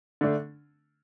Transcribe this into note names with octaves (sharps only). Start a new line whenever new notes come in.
D3 A3 D4